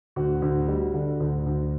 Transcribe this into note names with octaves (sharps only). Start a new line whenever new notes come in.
D2 F#4
D2
G3
D3
D2
D2